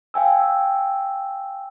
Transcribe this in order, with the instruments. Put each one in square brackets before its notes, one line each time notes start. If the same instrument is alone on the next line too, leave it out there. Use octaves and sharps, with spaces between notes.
[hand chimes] F5 G5 G#5 E6